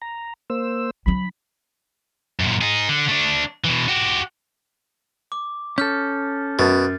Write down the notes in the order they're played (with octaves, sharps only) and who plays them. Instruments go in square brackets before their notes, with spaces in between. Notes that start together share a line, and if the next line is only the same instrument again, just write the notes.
[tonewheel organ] A#5
A#3 C5 E6
[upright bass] F#3 D4 [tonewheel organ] B5
[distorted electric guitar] F#2 A#2
D#4 G#4
D3
A3 D4
B2 E3
F#4 G4
[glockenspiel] D6
[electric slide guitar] C#4 A4 [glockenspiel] F6 G6
[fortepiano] F#2 [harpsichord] B2 [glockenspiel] A6